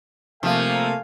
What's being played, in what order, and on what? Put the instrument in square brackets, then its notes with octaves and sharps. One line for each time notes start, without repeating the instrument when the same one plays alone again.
[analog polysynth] C3 A3 A#3 [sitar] F3 [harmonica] A4 F5 G#5